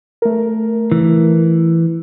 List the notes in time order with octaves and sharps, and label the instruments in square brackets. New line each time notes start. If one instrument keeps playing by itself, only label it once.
[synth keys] A3 A#4
[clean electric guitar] E3